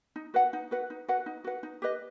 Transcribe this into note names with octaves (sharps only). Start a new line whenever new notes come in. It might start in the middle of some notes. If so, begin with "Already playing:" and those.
D#4
F#4 B4 F#5
D#4
F#4 B4 F#5
D#4
F#4 B4 F#5
D#4
F#4 B4 F#5
D#4
G4 B4 D#5